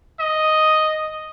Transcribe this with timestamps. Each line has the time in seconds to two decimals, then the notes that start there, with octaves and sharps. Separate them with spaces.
0.20 D#5